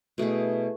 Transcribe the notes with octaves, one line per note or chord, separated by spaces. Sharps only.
B2 A3 E4 G#4